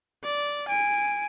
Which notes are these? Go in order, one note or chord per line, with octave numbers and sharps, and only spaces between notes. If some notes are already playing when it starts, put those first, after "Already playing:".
D5
G#5 D7